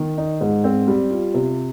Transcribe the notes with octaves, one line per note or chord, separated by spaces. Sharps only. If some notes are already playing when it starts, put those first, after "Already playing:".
Already playing: D#3
D#4
G#2
C4
G3
F4
C3